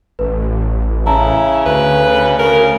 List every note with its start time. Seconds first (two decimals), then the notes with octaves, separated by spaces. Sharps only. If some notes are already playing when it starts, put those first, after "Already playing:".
0.19 A1 B4
1.06 C#3 E4 A5 A#5
1.66 D2 B4
2.39 C#3 A#4